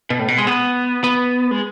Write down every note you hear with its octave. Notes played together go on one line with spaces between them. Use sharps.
B2
A2
B2
G#3
B3
B3
G#3